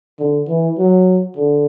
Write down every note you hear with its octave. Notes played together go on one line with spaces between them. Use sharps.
D3
E3
F#3
D3